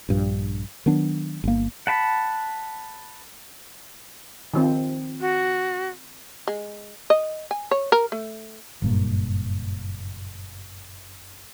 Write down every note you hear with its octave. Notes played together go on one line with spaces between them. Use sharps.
A#1 G2
D#3 F#3 B3 D4
G1 A#3
F#5 A5 B5
D#3 F3 C4
F#4
G#3
D#5
G#5
C#5
A#4
A3
F#1 G2 A#2